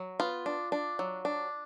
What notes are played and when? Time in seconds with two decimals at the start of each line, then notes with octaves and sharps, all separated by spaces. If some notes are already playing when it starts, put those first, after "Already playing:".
Already playing: F#3
0.20 B3 F4
0.46 D4
0.72 D4
0.99 F#3
1.25 D4